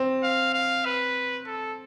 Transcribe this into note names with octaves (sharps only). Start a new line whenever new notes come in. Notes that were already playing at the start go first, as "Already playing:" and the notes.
Already playing: C4
F5
F5
B4
A4